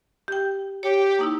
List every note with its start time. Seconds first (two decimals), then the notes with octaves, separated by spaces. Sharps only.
0.28 G4 G5
0.83 G4 C#5
1.19 A#3 D#4 E4